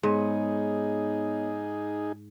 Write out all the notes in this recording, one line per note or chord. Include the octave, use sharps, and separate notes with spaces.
G#2 B3 D#4 G#4 C#5 D#5